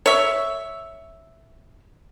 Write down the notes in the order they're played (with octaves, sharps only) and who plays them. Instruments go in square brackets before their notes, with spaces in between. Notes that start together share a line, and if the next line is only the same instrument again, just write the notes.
[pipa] C#5 E5